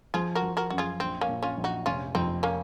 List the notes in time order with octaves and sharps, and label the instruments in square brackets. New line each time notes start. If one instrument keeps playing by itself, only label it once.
[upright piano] F3 [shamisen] F4 G#4
[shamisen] F#4 A#4
[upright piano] F3
[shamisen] F#4 A#4
[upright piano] F#2 [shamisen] F#4
[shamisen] F4 G#4
[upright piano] A#1 [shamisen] C4
[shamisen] A#3 C#4
[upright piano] A#2
[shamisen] C#4 F4
[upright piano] A#1
[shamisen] D#4 F#4
[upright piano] F1 [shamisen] C#4 F4
[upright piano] F2 [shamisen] C4 D#4
[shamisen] A#3 C#4